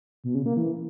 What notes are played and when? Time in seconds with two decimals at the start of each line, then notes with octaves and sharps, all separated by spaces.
0.24 B2
0.35 C#3
0.46 A#3
0.57 E3